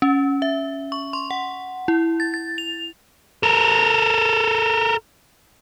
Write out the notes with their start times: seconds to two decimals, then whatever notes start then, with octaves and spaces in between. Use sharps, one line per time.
0.02 C#4
0.42 E5
0.92 C#6
1.13 C6
1.31 F#5
1.88 E4
2.20 A6
2.34 A6
2.58 F7
3.43 A4 A#4